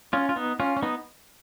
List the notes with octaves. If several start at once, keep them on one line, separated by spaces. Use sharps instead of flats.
C#4 F4
F4
B3 D#4
C#4 F4
C#4
B3 D#4